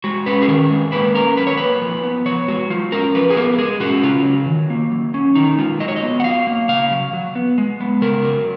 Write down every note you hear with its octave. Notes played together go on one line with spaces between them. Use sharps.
G#3 F#4
C#4 B4
G#4
D#3 A#4
G#3
A#3 B4
C#4 A#4
F#3 B4
C#5
A#3 B4
F3
B3
F3 C#5
G#3 F#4
F#3 F4
C#4 A#4
F3 B4
G#4
B3 A#4
G#3 G#4
C#4 F#4
C#3 F4
F#3
D#3
A#3
F#3
C#4
D#3 D#4
G#3 F4
F#3 D#5
C#5
D#5
B3
F#5
F#3 F5
A#3
C#3 F5
F#3
F#3
B3
G#3
B3
C#3 A#4
F#3